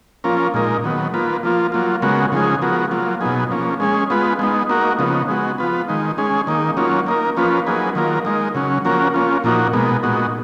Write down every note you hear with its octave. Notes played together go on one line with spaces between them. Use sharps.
F3 A#3 C#4 F4 A#4
A#2 G#3 D#4 A#4
D#3 F#3 B3
A#3 F4 B4
F3 A#3 F4
F#3 A#3 F4
C#3 G#3 B3 F#4 A#4
C#3 F3 G#3 D#4 G#4
F3 B3 F#4 A#4
F#3 A#3 F4
B2 F#3 B3 D#4 G#4
F3 A#3 C#4
G#3 C#4 G#4
G#3 B3 F4 B4
G#3 B3 D#4
A#3 D#4 F#4 A#4
C#3 F3 B3 D#4
G#3 B3 F#4
F3 B3 F4 B4
D#3 G#3 D#4
G#3 C#4 G#4
D#3 A#3 D#4
F#3 A#3 C#4 F4
A#3 D#4 A#4
F3 A#3 C#4 F4 B4
F#3 A#3 D#4 G#4 B4
D#3 F#3 A#3 F4 A#4
G#3 D#4 A#4
C#3 F#3 C#4
F3 A#3 C#4 F#4 A#4
A#3 C#4 F4
A#2 F3 A#3 D#4 F#4
B2 G#3 B3 D#4 A#4
A#2 G#3 B3 D#4 F#4